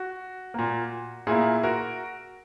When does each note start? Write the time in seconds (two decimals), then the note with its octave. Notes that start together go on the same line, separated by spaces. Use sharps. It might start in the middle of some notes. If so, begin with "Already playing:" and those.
Already playing: F#4
0.54 A#2 A#3
1.27 A#2 A#3 E4 G#4
1.63 F#4 A#4